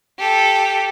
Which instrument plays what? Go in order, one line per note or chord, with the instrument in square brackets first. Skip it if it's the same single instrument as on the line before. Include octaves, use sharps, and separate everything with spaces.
[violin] G4 A4